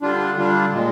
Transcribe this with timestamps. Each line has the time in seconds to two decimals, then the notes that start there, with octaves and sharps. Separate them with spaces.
0.02 D3 G3 D4 F4
0.37 D3 G3 D4 F4
0.73 A#2 G#3